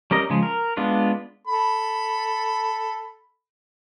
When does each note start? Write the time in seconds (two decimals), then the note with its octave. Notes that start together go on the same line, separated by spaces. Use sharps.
0.11 G3 C#4 A#4 D#5
0.30 C#3 F3 G#3
0.43 A#4
0.77 G#3 B3 D4 F4
1.47 A4 B5